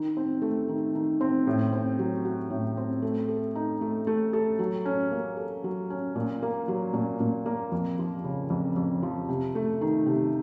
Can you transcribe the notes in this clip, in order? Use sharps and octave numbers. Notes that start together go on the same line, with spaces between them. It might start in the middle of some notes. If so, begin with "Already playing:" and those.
Already playing: D#3
C4
A3
D#3
D#3
C4
A2
C4
F#3
F#4
A2
C4
A3
A4
D#4
A3
A3
A4
F#3
C#4
A#3
A4
F#3
C#4
A#2
A#3
F#3
A#2
A#2
A#3
F2
F3
C#3
F2
F2
F3
C3
A3
D#3
C3